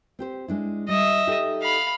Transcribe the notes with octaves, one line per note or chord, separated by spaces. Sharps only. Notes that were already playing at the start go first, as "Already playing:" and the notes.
C4 G4 C5
G#3 D4 E4
G3 D#5 E5
D#4 G4 A4
F5 B5